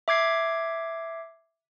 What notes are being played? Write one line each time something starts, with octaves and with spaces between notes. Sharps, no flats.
E5 D6 G#6 C7